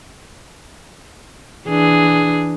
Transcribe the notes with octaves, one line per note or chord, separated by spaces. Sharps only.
E3 D4 G#4